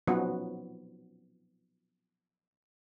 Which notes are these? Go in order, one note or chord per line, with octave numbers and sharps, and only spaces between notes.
F3 F#3 B3 C#4 D#4 F#4